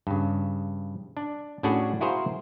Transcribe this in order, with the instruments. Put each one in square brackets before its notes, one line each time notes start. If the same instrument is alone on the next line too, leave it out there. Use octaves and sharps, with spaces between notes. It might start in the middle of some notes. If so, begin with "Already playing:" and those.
[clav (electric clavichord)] G2 C#3
D4
A2 C#4 D4 F#4 G#4
E4 F#4 G#4 A#4 C5 F5